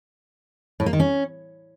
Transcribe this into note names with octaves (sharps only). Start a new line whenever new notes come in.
A2
A#3
D#3
C#4